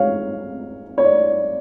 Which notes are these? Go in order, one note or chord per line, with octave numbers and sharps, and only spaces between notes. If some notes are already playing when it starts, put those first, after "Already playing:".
Already playing: G#3 C#5 F5
C#5
D5